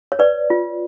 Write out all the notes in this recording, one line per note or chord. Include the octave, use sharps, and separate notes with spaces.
C#5
B4 D5
F4